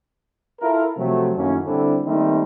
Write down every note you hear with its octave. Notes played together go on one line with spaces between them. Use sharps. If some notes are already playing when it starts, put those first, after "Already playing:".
E4 F4 A4 A#4
C3 F3 F#3 A3
F#2 A2 D#3 A#3 C#4
D3 G3 C4 D4 E4 A4
D#3 G3 A3 A#3 C4 D#4